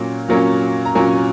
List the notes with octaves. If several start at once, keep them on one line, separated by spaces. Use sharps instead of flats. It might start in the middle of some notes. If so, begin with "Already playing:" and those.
Already playing: A#2 F#3 A#3 C#4
A#2 F#3 A#3 C#4
A#5
A#2 F#3 A#3 C#4 G#5